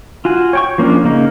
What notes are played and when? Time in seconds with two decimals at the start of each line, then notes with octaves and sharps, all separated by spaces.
0.25 F4 F#4 G#5
0.53 C#5 G5 C#6
0.78 F3 A#3 C#4 D4
1.04 C#3 A#3 D#4